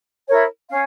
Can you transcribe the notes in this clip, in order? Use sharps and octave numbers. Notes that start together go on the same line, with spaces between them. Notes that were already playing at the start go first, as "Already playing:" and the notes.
E4 A#4 C#5
C#4 F5